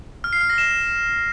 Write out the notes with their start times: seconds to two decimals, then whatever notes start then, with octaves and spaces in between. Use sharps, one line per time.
0.24 F6
0.33 C7
0.41 F6
0.50 A#6
0.58 E7